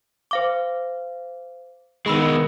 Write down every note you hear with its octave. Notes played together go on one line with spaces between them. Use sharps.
C5 F5 D6
D#3 G#3 B3 G#4 B5 E6